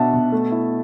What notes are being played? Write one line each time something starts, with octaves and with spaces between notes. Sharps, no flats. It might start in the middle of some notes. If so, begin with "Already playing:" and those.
Already playing: B2 B3 D4 E5 F#5 A5
B2
A3
E4